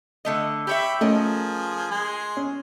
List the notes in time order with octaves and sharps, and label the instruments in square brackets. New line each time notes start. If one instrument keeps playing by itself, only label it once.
[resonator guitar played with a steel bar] D3 A3 D#5
[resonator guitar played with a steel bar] G4 C#5 E5 [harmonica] G5 B5 E6
[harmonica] F3 G#4 [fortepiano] A3 C#4 [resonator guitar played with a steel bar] A#4 D#5
[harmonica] G#3 G#4 C6
[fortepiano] C#4